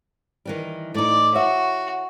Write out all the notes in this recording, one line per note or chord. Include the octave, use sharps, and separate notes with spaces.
D#3 E3 G3
A2 D#4 D5
F#4 C#5 E5